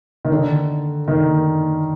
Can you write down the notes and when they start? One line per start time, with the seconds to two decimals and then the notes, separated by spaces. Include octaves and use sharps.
0.25 D#3
0.31 D3
1.08 D#3